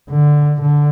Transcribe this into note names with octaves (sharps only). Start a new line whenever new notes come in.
D3
D3